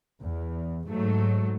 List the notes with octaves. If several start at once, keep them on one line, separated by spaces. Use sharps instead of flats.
E2
G#2 F#3 A3